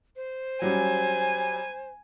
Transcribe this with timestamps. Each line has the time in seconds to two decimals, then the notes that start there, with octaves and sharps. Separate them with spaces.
0.16 C5
0.62 F#3 G3 C#4 G#5